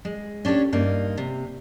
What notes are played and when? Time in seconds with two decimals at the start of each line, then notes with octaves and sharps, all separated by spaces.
0.05 G#3
0.45 C#4 D4 G4 A4 C#5
0.73 G2 A#3 D#4
1.17 C3